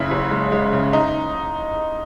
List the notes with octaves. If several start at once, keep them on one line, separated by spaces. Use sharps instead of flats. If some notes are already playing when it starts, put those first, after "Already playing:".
Already playing: F#1 C#3 E4
F#1
G#3
G#3
C#3
D#4